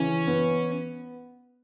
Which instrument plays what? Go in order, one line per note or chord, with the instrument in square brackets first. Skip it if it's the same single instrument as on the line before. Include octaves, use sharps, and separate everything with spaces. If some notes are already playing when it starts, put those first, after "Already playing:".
Already playing: [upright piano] C#3 E3 [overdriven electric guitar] C#4
[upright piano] B3